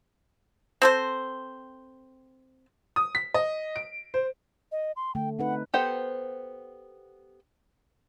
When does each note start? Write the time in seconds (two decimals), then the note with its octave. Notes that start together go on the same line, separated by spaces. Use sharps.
0.82 C4 A4 C5
2.96 D#6
3.15 B6
3.34 D#5
3.76 D7
4.14 C5
4.72 D#5
4.96 C6
5.15 D3 A3 G5
5.39 C4 D#4 B4 F#5
5.74 B3 G4 A4 C5 F#5